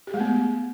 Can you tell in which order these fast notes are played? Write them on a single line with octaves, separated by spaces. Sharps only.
G4 G#4 G#3 A3 B3